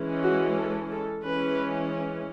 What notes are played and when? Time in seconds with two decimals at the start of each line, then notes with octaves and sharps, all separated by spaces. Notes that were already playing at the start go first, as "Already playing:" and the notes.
Already playing: E3 G#3 C#4
0.23 F#4
0.56 A4
0.90 A4
1.24 E3 G#3 C#4 B4